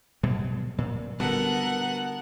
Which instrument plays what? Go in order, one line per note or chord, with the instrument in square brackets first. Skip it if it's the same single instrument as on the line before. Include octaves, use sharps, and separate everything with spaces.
[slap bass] B2 F#3 G3
A#2
[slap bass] D3 G3 [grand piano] B3 F#4 A4 [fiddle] A#4 F#5